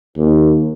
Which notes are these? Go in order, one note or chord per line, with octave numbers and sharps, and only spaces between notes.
D#2